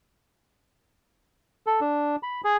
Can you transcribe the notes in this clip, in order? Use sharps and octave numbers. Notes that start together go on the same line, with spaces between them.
A4
D4
B5
G#4